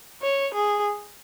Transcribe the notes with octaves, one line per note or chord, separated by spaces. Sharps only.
C#5
G#4